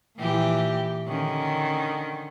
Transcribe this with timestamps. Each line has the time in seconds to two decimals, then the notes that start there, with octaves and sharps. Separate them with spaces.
0.17 A#2 E3 G4
1.08 D3 D#3 C#4